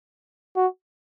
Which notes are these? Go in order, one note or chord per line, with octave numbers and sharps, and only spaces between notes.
F#4